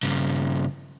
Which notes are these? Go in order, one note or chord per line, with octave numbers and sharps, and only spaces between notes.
G2 C#3